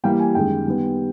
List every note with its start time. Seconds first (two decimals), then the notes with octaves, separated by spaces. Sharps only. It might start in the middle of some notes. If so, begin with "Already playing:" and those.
0.04 E3 G3 A#3 G5
0.19 G#5
0.35 F#2 D#3 G#3 G5
0.66 D#3 G3 B3